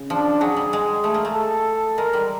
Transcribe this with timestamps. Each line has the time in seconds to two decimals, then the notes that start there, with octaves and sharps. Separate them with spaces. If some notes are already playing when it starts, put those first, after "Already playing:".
Already playing: C#3
0.10 F3 D4
0.41 F#3 G#4
0.57 G3
0.73 G#3
1.04 A3
1.14 A#3
1.25 A3
1.35 A4
1.97 G#3 A#4
2.13 G3